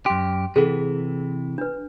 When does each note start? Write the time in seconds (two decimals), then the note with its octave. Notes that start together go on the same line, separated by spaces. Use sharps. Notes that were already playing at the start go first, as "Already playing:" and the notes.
0.06 F#2 G4 C6
0.56 C3 E3 G#4 A4 F#5
1.58 D4 B4